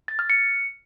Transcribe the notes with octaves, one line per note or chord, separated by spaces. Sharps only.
A6
F6
C#7